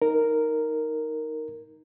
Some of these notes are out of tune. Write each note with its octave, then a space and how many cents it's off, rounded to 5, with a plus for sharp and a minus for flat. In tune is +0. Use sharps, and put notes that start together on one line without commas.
D#4 +10 A#4 -5